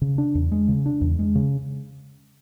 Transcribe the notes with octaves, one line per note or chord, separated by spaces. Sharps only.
C#3
D4
E2
G#3
C#3
D4
E2
G#3
C#3